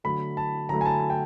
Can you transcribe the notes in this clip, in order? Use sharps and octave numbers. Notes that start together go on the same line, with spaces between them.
D3 F#3 A3 B5
A5
D3 F#3 A3 A#5
G#5
A5
G5